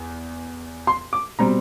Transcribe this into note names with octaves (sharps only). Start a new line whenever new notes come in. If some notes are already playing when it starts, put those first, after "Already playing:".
Already playing: E2
C6
D6
B2 G3 C4 A#5